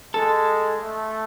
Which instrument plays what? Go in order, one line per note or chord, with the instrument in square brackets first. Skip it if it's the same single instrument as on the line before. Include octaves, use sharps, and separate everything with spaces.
[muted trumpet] G#3 [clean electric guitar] A4
[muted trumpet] A3